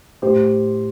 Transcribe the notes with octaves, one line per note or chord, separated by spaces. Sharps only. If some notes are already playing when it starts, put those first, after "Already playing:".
A2 G4 C5